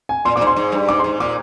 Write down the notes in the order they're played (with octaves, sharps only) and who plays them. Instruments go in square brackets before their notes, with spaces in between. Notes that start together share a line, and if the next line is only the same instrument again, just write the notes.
[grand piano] G#5
[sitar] A#2 [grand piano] C6
[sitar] A#2 [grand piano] D6
[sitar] G#2
[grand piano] C6
[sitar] G#2
G2
[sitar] G#2 [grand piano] D6
[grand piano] C6
[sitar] G#2
[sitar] A#2 [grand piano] D6